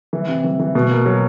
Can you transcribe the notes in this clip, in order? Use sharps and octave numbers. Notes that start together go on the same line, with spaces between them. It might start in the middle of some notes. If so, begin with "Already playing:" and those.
E3
C3
E3
E3
B2
A#3
F#3